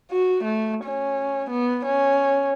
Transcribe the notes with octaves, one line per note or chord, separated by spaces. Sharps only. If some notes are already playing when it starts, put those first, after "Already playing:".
F#4
A3
C#4
B3
C#4